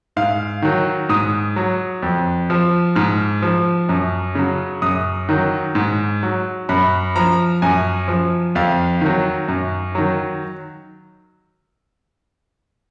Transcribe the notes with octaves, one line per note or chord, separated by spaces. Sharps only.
G#2 F5
D#3 F#3
G#2 D#6
F#3
F2
F3
G#2 F6
F3
F#2
C#3 F#3
F#2 D#6
D#3 F#3
G#2
F#3
F#2 B5
F3 A#5
F#2 G#5
F3
F2 F5
D#3 F#3
F#2
D#3 F#3